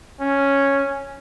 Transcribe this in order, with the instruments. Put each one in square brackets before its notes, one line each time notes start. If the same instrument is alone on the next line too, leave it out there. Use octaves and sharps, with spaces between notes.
[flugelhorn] C#4